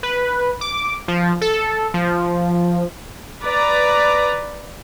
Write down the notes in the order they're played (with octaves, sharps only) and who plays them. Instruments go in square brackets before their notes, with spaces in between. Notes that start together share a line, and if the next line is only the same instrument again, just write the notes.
[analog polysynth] B4
D6
F3
A4
F3
[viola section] B4 D5 A#5